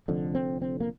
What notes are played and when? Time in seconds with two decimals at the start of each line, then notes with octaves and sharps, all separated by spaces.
0.08 F1 F2 D3
0.35 C4
0.62 C4
0.80 A#3